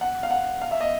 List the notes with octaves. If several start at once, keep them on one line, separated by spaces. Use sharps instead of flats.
F#5
F5
F#5
F5
E5
D#5